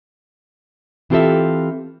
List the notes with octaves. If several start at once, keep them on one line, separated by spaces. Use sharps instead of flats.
E3 C4 F4 G4 A4 E5